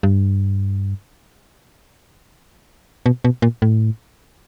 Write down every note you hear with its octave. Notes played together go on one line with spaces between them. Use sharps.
G2
B2
B2
A#2
A2